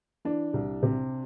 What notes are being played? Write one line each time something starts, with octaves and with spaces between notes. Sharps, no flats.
E3 D4
C2
C3